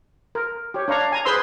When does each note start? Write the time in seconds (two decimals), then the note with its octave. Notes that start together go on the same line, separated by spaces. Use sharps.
0.35 A#4
0.74 G4 C#5
0.88 D4 C#5 F5 A#5
1.12 G#5 A#5
1.25 G#4 B4 C5 C6 E6